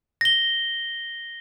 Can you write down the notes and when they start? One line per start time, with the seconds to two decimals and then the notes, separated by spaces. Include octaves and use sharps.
0.21 A#6 G7